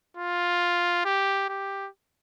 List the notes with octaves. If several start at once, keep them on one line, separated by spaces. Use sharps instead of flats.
F4
G4
G4